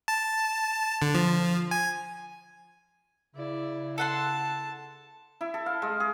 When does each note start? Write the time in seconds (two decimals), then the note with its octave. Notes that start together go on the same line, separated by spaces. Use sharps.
0.08 A5
1.02 D3
1.15 F3
1.71 G#5
3.35 C#3 E4 D5
3.98 A4 F#5 A5 C6
5.41 E4
5.54 A4
5.66 F5
5.82 G#3
6.00 G#4